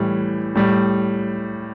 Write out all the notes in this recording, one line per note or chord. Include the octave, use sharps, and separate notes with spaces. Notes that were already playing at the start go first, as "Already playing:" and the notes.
Already playing: A2 E3 G3
A2 G3